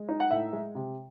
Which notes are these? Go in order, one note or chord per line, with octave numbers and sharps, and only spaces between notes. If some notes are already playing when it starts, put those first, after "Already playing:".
Already playing: G#3
D#4
F#5
A2 E5
G#3
C3